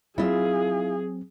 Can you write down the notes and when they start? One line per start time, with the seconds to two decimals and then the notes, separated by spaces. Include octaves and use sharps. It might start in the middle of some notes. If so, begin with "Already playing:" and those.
0.18 F#3 C4 E4 F4 G#4